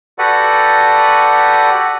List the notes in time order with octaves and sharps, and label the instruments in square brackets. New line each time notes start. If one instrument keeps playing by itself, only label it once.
[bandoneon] F#4 G4 A4 B4 D5 F#5